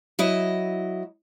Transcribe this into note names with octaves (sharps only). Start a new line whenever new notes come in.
F#3 E4 D#5